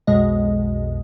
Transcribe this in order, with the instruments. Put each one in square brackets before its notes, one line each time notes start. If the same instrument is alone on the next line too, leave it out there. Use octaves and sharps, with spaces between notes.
[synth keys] B1 F2 B2 G#3 D#5